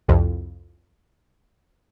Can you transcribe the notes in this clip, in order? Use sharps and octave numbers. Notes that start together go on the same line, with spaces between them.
C2 F2